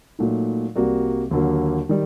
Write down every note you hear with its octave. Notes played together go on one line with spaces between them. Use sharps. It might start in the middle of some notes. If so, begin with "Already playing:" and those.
A#2 F#3 A3 D#4
C2 C3 G3 A#3 F#4
D#2 D3 F#3 A#3
D#3 G3